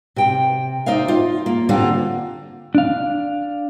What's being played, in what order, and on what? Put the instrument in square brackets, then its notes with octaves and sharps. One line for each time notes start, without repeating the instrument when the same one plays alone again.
[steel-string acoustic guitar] C3 G5
D#4 C5 D5 E5 F5
F4
A#3
D3 G3 A#3 C4 F4
[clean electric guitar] D4 F5